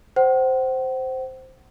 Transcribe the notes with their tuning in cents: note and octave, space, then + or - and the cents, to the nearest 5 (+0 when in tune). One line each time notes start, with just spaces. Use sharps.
C5 +0 F#5 +40